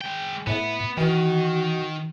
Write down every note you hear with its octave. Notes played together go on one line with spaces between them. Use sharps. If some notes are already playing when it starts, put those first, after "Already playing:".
G#3 G5
A2 B3 E5
D#3 E3 F#4